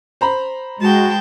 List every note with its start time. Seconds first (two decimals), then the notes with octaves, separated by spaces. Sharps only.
0.21 C5 A#5 B5
0.81 G#3 F#4 G5 A5